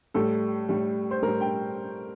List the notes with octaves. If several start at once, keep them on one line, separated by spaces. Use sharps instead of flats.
A2 G3 A4
A2 G3
C5
A2 A#4
G3
G5